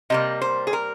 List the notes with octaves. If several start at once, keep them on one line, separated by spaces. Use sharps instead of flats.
C3 G3 A#3 D#5
C5
G#4
A#4